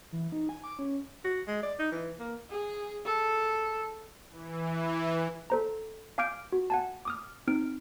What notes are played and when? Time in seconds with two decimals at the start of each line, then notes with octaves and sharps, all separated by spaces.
0.12 E3
0.32 D#4
0.49 G#5
0.64 D6
0.79 C#4
1.24 F#4
1.48 G#3
1.63 D5
1.79 D#4
1.92 E3
2.19 A#3
2.51 G#4
3.05 A4
4.31 E3
5.50 A4 C5 A#5
6.18 F5 G#5 D6 F6 G6 D7
6.52 F#4
6.70 F#5 G#5 A5
7.05 D6 D#6 F6
7.47 C4 D#4 F6 D7